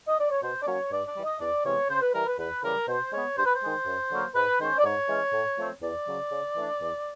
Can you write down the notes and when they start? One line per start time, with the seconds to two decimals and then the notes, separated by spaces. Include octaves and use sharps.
0.08 D#5
0.19 D5
0.30 C#5
0.42 B2 C5
0.62 D5
0.66 F#3 A#3 C#4 C#5
0.91 G2 D5
1.07 D5
1.16 E3 G3
1.24 D#5
1.40 E2 D5
1.65 C3 E3 G#3 B3 C#5
1.89 C#3 C5
2.01 B4
2.14 E3 G3 A#4
2.27 B4
2.39 E2 B4
2.63 C#3 E3 G3 A#4
2.88 B2 C5
3.12 G#3 B3 C#5
3.37 G2 C5
3.45 B4
3.53 C5
3.62 D#3 G#3
3.86 F#2
4.10 D3 F#3 A#3
4.35 G#2 B4
4.60 D#3 G#3 C#4 C5
4.78 D5
4.84 G#2 C#5
5.09 E3 G#3 C#4
5.33 A2
5.58 F3 A3 C4
5.82 E2 D5
6.07 C#3 F#3
6.32 C#3
6.56 E3 A3 D4
6.81 E2